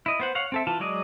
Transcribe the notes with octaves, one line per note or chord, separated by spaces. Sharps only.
E4 D#5
B3 C5 F#5
C#5 F5 F#5
C4 A4 E5
E3 F4 A5
F#3 G#3 D5 D#5